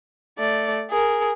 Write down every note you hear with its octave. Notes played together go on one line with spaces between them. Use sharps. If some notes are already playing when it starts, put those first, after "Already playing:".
A3 D5
G#4 A#4